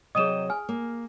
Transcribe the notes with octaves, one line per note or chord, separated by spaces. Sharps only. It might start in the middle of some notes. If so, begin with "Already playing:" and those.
C3 F#3 G#4 D#5 G5 D#6 D#7 E7
G#5 F6
A#3